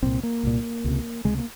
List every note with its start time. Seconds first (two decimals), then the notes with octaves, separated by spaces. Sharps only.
0.03 C2 A#2 C4
0.23 A#3
0.43 C2 A#2
0.84 C#2 C3
1.25 C#2 C3 G#3
1.38 A#3